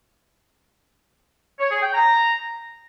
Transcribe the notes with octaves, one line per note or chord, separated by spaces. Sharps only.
C#5
G#4
G5
A#5